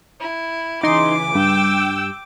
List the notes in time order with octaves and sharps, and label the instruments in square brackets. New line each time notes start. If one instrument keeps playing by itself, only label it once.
[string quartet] E4
[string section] C#3 E3 G#5 [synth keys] D#4 C6 [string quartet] D6
[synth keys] G2 [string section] G5 E6